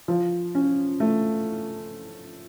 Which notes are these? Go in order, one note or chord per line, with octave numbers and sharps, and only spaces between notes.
F3
C#4
A3